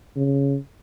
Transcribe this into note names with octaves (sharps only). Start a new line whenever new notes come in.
C#3